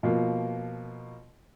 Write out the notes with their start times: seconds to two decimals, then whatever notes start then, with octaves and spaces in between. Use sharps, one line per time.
0.03 B2 F3 A#3